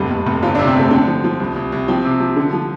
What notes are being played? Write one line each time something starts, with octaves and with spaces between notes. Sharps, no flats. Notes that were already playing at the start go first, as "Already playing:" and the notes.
Already playing: F1 G2
F1
F1
G1 F4
D4
C3
C4
C3 A3
D3 C4
F3
F3
C2
C2
C2
F3 C4
C3
F3
D3
F3